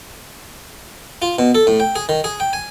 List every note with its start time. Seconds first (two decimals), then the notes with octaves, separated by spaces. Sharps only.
1.22 F4
1.39 B2
1.55 A4
1.67 A2
1.80 G5
1.96 G#4
2.09 D#3
2.24 G#4
2.40 G5
2.53 G#5